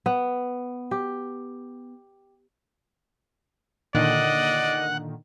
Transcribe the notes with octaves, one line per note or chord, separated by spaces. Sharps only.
B3
G4
A#2 D3 D#3 D5 D#5 F#5